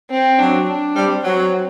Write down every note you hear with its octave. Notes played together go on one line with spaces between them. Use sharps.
C4
F#3 D4
D4
G3 C4
F#3 C4